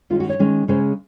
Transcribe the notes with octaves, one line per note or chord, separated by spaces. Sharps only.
D#3 G#3 C#4 F4
F#4
C#5
D#3 G#3 C#4
C#3 G#3 C#4 C5